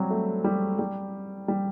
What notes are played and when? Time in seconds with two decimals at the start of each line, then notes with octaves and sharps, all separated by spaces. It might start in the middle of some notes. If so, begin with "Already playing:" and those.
Already playing: F#3 G3 C4
0.11 A3
0.44 G3
0.79 G3
1.48 G3